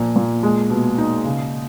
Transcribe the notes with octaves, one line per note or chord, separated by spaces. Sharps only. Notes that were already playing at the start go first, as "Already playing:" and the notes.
Already playing: A#2 F3
A#2
G#3
B2
D#4
C#3